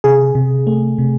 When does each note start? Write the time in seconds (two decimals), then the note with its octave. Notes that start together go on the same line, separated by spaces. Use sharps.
0.04 C3 G#4
0.35 C3
0.67 A3
0.98 C3